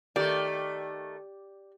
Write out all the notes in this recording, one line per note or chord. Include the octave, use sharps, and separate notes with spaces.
D#3 A3 G4 D5